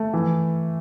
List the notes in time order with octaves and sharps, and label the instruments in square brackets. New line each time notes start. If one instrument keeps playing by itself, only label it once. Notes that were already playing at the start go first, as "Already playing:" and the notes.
Already playing: [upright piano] A3
E3